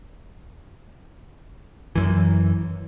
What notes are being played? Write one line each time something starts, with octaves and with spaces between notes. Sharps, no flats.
F#2 E3